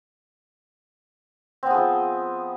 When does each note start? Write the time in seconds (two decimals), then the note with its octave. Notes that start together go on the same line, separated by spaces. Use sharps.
1.63 C4
1.67 B3
1.70 G#4
1.74 F3